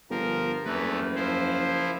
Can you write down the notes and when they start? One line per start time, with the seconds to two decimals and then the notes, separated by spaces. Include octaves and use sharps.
0.10 G1 F3 A#4
0.65 F#1 E2 A3 B4
1.16 F3 E4 C5